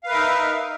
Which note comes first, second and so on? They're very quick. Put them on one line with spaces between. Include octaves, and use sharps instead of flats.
F5 B4 A#4 E5 D#4